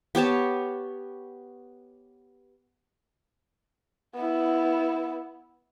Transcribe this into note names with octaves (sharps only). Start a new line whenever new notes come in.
B3 G4 C#5 A5
B3 E4